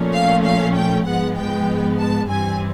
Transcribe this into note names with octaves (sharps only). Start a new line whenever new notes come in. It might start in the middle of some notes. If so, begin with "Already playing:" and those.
Already playing: A#2 F3 A3 C#4
F5
F5
G5
G#2 F3 G#3 B3 F#5
G5
A5
G2 E3 G3 C4 G#5